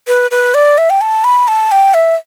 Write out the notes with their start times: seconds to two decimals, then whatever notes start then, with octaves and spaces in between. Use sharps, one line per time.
0.07 B4
0.31 B4
0.54 D5
0.78 E5
0.90 G5
1.01 A5
1.24 B5
1.48 A5
1.72 G5
1.94 E5